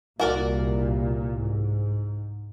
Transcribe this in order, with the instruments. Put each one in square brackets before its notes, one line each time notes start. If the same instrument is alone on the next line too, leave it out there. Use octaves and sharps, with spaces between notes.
[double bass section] C2 A#2 [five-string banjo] F#4 A#4 D5
[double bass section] G#2